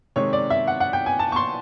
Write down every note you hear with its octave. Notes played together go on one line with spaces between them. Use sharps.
C3 D#3 G#3 C#5
D5
E5
F#5
F#5
G5
G#5
A5
C#6
C6